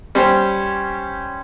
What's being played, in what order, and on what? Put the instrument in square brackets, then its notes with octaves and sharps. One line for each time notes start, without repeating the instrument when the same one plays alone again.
[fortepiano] G3 C#4 G4 C5